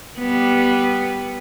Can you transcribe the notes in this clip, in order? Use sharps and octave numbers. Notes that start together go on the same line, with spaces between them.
G3 B3